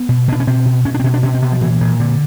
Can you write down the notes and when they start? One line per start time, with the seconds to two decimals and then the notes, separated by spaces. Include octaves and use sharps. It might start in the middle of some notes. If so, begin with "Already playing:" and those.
Already playing: B3
0.09 B2
0.28 B2 D4
0.40 C#4
0.47 B2 C4
0.65 B2
0.85 B2 C#4
0.94 D4
1.00 C4
1.04 B2 C#4
1.14 D4
1.23 B2 C#4
1.35 C4
1.42 B2 B3
1.52 F3
1.61 A#2 E3
1.81 A#2
2.00 A#2 D3